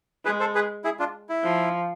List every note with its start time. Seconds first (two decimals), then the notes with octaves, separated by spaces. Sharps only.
0.25 G#3 G#4 B4
0.40 A4 C5
0.55 G#4 B4
0.84 E4 G#4
0.99 D4 F4
1.29 E4
1.43 F3